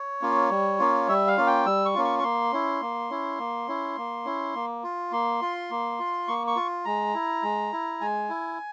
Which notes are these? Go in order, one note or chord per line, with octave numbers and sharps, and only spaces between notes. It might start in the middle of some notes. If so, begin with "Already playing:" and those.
Already playing: C#5
A#3 C#4 F4
G3
A#3 C#4 F4
G3 E5
F5
A#3 C#4 F4
G5
G3 E6
C#6
A#3 C#4 F4
C#6
C#6
A#3 C6
C#4 E4
A#3
C#4 E4
A#3
C#4 E4
A#3
C#4 E4
A#3
F4
A#3 C6
F4
A#3
F4
A#3 C#6
C#6
F4
G#3 A#5
E4
G#3
E4
G#3 G#5
E4